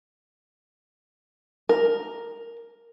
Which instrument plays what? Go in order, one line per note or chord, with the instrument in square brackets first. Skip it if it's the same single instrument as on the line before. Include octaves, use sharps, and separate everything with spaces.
[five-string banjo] A#4